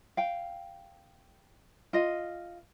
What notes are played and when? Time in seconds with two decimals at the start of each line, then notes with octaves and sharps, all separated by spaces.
0.17 F5 G5
1.93 F4 D#5